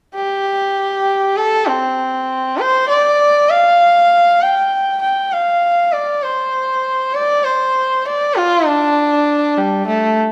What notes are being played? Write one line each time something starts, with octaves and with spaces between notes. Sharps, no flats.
G4
A4
C4
C5
D5
F5
G5
G5
F5
D5
C5
D5
C5
D5
F4
D4
G3
A3